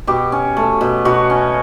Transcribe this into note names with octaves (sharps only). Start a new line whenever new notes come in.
B2 G4
C#4
A3
B2
B2 F#4
C#4